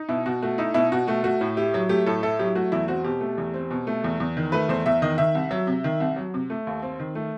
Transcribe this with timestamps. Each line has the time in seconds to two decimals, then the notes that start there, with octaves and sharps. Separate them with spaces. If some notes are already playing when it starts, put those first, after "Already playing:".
Already playing: D#4
0.09 B2 E4
0.26 B2 F#4
0.42 A3 F#4
0.58 D#4 E4
0.74 B2 E4
0.92 B2 F#4
1.07 A3 F#4
1.24 A3 F#4
1.41 A2
1.56 E4 G4
1.74 F#3
1.89 A3 G4
2.06 A2 A4
2.23 E4 A4
2.39 F#3 G4
2.55 A3 F#4
2.72 E2 E4
2.88 C4 F#4
3.04 B2 G4
3.21 A3
3.38 E2
3.54 C4
3.71 B2
3.87 A3
4.04 E2
4.20 E2
4.37 D#3
4.52 A3 B4
4.69 E2 C5
4.86 E2 E5
5.02 D#3 D#5
5.18 D#3 E5
5.35 C2
5.51 F#3
5.67 C3
5.84 D#3
6.00 C2
6.16 F#3
6.34 C3
6.50 A3
6.67 D#2
6.82 C4
7.00 D#3
7.15 A3